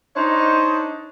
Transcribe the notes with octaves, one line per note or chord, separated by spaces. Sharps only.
D4 D#4 C5 C#5 D#5